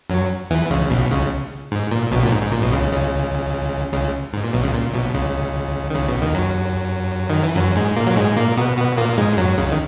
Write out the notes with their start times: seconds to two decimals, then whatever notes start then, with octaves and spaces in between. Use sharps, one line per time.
0.10 F#2 F#3
0.50 E2 E3
0.70 C#2 C#3
0.90 B1 B2
1.11 C#2 C#3
1.72 G#2
1.91 A#2
2.12 B1 B2
2.25 A#2
2.32 G#2
2.43 G#2
2.52 A#2
2.62 B1 B2
2.72 C#2 C#3
2.93 C#2 C#3
3.93 C#2 C#3
4.33 G#2
4.44 A#2
4.53 B1 B2
4.64 C#2 C#3
4.74 A#2
4.94 B1 B2
5.14 C#2 C#3
5.90 D#3
5.94 C#2 C#3
6.08 B1 B2
6.22 D#2 D#3
6.35 F#2 F#3
7.30 D#3
7.43 E3
7.56 F#2 F#3
7.76 G#2 G#3
7.96 A#2 A#3
8.07 F#3
8.17 G#2 G#3
8.37 A#2 A#3
8.57 B2 B3
8.77 B2 B3
8.98 A#2 A#3
9.18 G#2 G#3
9.37 F#2 F#3
9.57 C#2 C#3
9.72 D#3